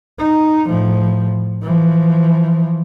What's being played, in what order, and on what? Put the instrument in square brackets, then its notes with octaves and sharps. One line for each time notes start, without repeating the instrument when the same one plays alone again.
[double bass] D#4
A2 F3
E3 F3